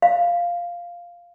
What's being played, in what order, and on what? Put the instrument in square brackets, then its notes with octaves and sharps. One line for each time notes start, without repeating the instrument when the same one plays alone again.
[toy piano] F5